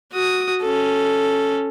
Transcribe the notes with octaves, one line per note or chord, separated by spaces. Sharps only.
F#4 D#6
C#4 A4